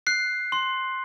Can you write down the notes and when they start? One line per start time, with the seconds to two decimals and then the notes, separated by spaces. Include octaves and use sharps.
0.07 F#6 C7
0.52 C6